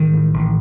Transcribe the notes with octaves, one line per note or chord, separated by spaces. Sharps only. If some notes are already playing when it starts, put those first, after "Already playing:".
Already playing: A1 D#3
A2
A1